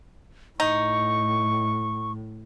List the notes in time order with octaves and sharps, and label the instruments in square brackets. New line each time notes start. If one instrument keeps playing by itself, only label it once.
[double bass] A2 [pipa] D#4 [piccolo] C#6